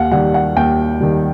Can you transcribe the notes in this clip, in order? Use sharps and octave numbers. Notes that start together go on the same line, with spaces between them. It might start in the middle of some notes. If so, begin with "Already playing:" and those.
Already playing: D#2 F5 F#5
D#3 G3 F#5
F#5
D#2 G5
D#3 G3